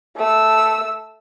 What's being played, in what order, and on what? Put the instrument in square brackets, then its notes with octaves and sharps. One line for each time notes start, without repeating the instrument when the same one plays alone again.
[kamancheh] A3 E6